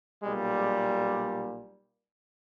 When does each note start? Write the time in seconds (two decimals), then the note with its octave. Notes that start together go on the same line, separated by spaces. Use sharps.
0.22 B1 A#2 G3 G#3
0.57 G#3